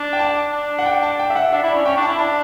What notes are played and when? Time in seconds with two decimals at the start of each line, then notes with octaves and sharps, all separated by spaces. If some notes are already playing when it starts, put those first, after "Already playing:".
Already playing: D4
0.13 G5
0.19 A5
0.52 D4
0.79 F#5
0.86 G5
1.03 A5
1.19 G5
1.30 E5
1.35 F#5
1.52 D4 E5
1.63 E4
1.69 D5
1.75 C#4
1.86 C#4 G5
1.97 D4
2.03 A5
2.08 E4
2.19 D4 A5